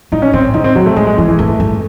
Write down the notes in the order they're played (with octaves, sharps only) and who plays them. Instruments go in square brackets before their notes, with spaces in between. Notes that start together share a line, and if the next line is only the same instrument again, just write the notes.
[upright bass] A2 [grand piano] D#4
[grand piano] C#4
[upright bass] A2 [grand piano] C4
[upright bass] C#3 [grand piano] D#4
[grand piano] C4
[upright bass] C3 [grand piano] F#3
[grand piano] A3
[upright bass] A2 [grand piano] G#3
[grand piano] G#3
[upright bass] G#2 [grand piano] E3
[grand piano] E3
[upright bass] G#2 [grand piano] A3
[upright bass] G#2